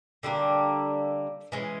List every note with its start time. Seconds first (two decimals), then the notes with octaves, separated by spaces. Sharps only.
0.23 D3 G3 A#3 D4
1.52 E3 G#3 C#4